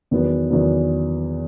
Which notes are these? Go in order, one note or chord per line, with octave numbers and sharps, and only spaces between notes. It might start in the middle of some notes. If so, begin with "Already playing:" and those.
E2 D#3 F#3 B3
E2 D#3 F#3 B3